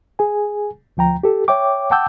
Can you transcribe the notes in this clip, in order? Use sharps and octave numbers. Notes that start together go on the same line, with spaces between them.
G#4 G#5
D2 F3 G5 A#5
G4 A4
C#5 E5 G5 D6
F#5 G5 A5 D6 E6 G6